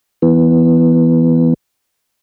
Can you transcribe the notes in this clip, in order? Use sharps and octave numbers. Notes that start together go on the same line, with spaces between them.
E3 B3